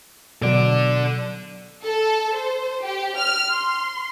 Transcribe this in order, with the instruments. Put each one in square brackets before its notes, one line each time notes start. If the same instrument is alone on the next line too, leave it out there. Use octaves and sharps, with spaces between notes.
[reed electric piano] B2 F#3 [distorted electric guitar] A4 D5
[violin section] A4
C5
G4
F6
C6